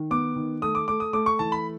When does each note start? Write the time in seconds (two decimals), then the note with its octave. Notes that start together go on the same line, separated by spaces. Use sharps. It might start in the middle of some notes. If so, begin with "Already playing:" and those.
Already playing: D#3
0.11 B3 D6
0.36 D#3
0.62 A3 D#6
0.75 D6
0.88 A3 D6
1.00 D#6
1.13 A3 D6
1.26 C#6
1.39 E3 A5
1.52 B5